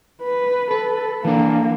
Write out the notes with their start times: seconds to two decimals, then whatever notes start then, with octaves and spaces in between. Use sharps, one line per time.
0.22 B4
0.71 A4 B4
1.25 E3 A#3 D4